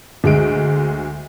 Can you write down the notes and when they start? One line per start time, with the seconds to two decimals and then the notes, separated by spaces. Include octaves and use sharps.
0.24 D2 G#3 D7